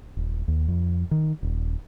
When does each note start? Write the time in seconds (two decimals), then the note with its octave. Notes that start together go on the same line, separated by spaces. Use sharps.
0.17 D#1
0.48 D#2
0.68 F2
1.11 D#3
1.43 D#1